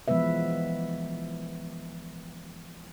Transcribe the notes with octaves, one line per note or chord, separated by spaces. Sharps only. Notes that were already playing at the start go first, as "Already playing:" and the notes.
E3 F3 G#3 B3 B4 E5